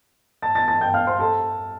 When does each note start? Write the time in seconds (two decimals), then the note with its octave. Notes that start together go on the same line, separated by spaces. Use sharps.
0.42 A5 A6
0.55 A5 A6
0.68 A5 A6
0.81 G5 G6
0.94 F5 F6
1.07 C5 C6
1.20 A4 A5